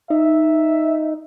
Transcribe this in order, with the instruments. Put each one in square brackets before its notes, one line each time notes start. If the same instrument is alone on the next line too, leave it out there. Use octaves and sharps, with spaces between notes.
[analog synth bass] D#4 [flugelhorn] E5